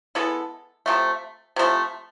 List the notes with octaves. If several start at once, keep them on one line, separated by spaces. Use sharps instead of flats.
G#3 B3 E4 A4
C3 F3 A3
C3 F3 A3